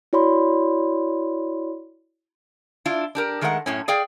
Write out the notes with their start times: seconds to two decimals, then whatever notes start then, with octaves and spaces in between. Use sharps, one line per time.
0.13 E4 F#4 C#5 D5 B5 C6
2.86 D4 E4 F4
3.15 D4 G4 A#4
3.41 D#3 G#3 A3 A#4 D#5 F#5
3.66 F#2 A2 C#4
3.88 G#4 D5 F5 G5